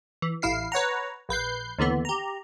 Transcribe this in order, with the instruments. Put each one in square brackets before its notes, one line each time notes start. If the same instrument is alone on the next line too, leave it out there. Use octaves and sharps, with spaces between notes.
[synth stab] E3
A1 E4 F5 C7
B4 C#5 F#5 A#5
A#1 B4 G6 C7
D#2 D3 E3 B3
G4 A#5